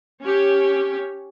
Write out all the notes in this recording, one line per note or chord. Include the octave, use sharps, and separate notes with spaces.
C#4 G4 C#5